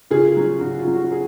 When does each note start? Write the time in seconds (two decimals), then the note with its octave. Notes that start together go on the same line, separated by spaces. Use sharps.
0.10 C#3 F4 G#4
0.36 F#3 C#4
0.61 C#3 F#4
0.78 F4
0.86 F#3 C#4
0.95 F#4
1.12 G#4